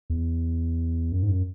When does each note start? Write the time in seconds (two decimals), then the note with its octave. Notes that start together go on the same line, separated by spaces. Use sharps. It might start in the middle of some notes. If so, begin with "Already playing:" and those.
0.10 E2
1.12 F#2
1.23 G#2
1.29 F#2